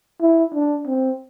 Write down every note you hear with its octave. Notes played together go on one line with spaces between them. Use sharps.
E4
D4
C4